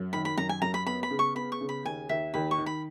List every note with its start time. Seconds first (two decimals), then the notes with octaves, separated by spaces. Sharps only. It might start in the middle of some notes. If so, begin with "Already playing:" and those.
Already playing: F#2
0.13 D#3 B5
0.25 B5
0.37 F#2 A#5
0.49 G#5
0.62 F#2 A#5
0.74 B5
0.86 B3 B5
1.03 B5
1.11 C#3
1.19 C#6
1.35 B3 B5
1.52 C#6
1.61 C#3
1.69 B5
1.85 D#2 G#5
2.09 D#2 E5
2.34 D#2 B5
2.51 C#6
2.58 D#3
2.66 B5